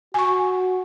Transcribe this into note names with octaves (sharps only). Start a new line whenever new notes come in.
F#4 G#5 C#6